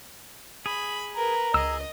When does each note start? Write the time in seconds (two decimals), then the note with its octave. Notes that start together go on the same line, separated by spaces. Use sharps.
0.66 G#4 B5
1.16 A#4 B4 A#5
1.54 C#2 G#4 D#5 E6